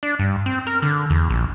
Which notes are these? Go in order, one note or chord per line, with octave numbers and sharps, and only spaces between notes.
D4
G2
C4
A#4
D3
E2
A#1